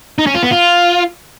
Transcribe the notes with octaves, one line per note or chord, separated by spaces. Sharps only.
D#4
C#4
F4
B3
F4